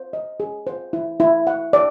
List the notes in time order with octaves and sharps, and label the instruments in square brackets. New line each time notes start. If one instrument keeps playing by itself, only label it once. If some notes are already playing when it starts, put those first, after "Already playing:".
Already playing: [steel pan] C5
D#5
G#4
C5
E4
E4
F#5
D5